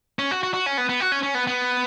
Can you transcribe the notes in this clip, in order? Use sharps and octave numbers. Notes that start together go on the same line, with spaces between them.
C#4
F#4
F#4
F#4
C#4
B3
B3
F#4
C#4
C#4
B3
B3